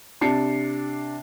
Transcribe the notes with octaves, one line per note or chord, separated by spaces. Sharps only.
C3 D4 A5 C7 C#7